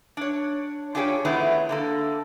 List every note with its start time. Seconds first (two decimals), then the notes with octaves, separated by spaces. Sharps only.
0.17 D4 C#5
0.95 D4 F4 G4 G#4 C5 C#5
1.25 D#3 F3 A3 B3 E4 G#4
1.69 D3 A#3 A4